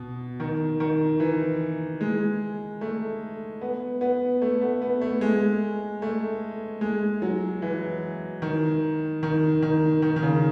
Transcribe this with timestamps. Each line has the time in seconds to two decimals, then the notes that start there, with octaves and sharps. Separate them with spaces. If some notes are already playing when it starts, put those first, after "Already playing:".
Already playing: B2
0.40 D#3
0.80 D#3
1.20 E3
2.01 G#3
2.81 A3
3.61 B3
4.01 B3
4.42 A3
4.61 B3
4.82 B3
5.01 A3
5.21 G#3
6.02 A3
6.81 G#3
7.22 F#3
7.62 E3
8.42 D#3
9.23 D#3
9.62 D#3
10.02 D#3
10.16 D#3
10.23 C#3